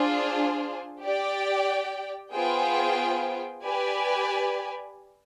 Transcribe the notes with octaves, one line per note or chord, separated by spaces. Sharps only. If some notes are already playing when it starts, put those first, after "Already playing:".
Already playing: D4 F4 G#4 C5
G4 D5 G5
B3 F4 G#4 C5 G5
G4 B4 D5 G#5